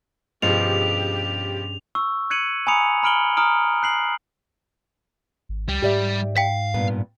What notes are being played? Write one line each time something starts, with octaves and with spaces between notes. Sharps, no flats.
G2 B2 F3 C#4 G4 G#4 F7
C#6 E6
F#6 G#6 C#7 D#7 F#7
G#5 A#5 B5 D#6 C#7 F7
A#5 B5 F6 D7 F#7 G7
A#5 D#6 F6 D7
F#6 C7 F#7
G#1
C#2 G3
G#2 G4 D5 E5
F5 G5 B6
G2 A#2 B3